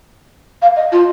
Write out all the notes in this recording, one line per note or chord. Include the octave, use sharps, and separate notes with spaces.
F5
D#5
F4